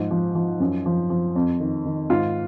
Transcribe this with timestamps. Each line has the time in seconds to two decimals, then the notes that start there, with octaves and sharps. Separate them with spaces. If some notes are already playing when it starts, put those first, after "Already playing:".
Already playing: G#2 F3
0.11 F3
0.35 F3
0.60 F#2
0.86 F3
1.10 F3
1.35 F2
1.60 D#3
1.85 D#3
2.10 G#2 F4